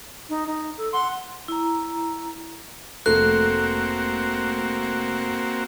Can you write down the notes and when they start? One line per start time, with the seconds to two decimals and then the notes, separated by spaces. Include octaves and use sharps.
0.29 D#4
0.47 D#4
0.77 A4
0.93 F#5 C6
1.48 E4 A#5
3.06 F1 A3 A#3 C4 F#4 A4 F#6